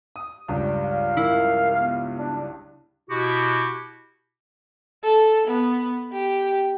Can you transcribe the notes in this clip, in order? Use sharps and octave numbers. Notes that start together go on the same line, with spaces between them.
D#6
C#2 G2 D5
F5
E4 A#4
B3
D4
B2 E4 F#4 G4
A4
B3
G4